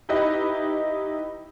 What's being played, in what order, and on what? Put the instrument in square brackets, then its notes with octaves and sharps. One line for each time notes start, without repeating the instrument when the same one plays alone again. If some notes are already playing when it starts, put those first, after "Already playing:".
[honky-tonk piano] D#4 E4 G4 B4 D#5